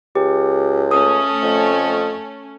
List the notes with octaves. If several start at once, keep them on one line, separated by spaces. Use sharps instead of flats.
C#2 G4
A3 C#4 D#6
F2